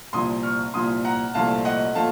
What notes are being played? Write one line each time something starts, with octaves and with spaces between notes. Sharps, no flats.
C2 A#2 F3 C6 D#6
C#6 F6
C2 A#2 F3 C6 D#6
F#5 A#5
C2 A#2 F3 A3 F5 A5
D#5 F#5
A#2 F3 A3 F5 A5